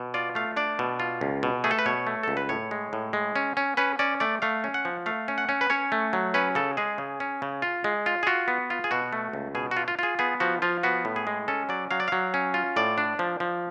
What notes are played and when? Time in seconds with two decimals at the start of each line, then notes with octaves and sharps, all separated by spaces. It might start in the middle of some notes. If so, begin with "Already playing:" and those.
Already playing: B2
0.14 F4 D5
0.35 A3 F5
0.56 D4 D5
0.79 B2
1.00 F4
1.21 C#2
1.43 B2
1.64 A3 G#4
1.71 A4
1.79 B4
1.86 B2 C#5
2.07 A3
2.23 C#2 A4
2.37 B4
2.49 A2 C#5
2.71 G#3
2.93 A2
3.13 G#3
3.36 C#4
3.57 C#4
3.77 C#4 B4
3.99 C#4 D5
4.20 A3 D5
4.42 A3 F5
4.64 C#4
4.74 F#5
4.85 F3
5.06 A3 F5
5.28 C#4
5.38 F#5
5.49 C#4
5.61 B4
5.70 C#4 C#5
5.92 A3
6.13 F#3
6.34 C#4 B4
6.55 C#3 A4
6.77 G#3 G#4
6.98 C#3
7.20 C#4
7.42 C#3
7.62 F4
7.84 G#3
8.06 F4
8.23 G#4
8.27 F4 F#4
8.48 B3
8.70 F4
8.84 G#4
8.91 B2 F#4
9.13 A3
9.33 C#2
9.55 B2 G#4
9.71 F#4
9.77 F4
9.88 F4
9.99 F4 G#4
10.19 B3 G#4
10.40 F3 F#4
10.62 F3 F4
10.83 B3 F#4
11.05 A2
11.16 G#4
11.27 G#3
11.48 C#4 A4
11.69 F#3 D5
11.91 F#3 F5
12.00 D5
12.08 F#3 F5
12.34 C#4
12.54 F4
12.76 A2 D5
12.98 D4
13.19 F3
13.40 F3